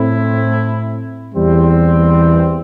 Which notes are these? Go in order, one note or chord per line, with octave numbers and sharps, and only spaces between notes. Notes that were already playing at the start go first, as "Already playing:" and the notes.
Already playing: A2 A3 C4 E4
E2 E3 G3 C4